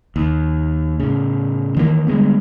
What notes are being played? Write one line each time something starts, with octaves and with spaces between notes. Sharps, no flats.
D#2
A2 C#3
D#3 E3 G3 A#3
D3 G3 G#3 B3